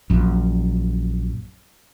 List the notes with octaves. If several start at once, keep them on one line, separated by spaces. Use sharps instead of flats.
A#1 F#2